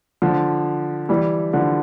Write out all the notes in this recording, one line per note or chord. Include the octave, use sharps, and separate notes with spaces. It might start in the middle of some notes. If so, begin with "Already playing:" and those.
D3 F3
E3 G3
D3 F3